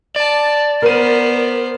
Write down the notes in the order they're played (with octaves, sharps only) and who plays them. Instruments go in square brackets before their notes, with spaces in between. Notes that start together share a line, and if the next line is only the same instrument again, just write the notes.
[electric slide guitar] D5 [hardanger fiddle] A5
[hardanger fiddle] B3 C5 [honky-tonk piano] A#4 D#7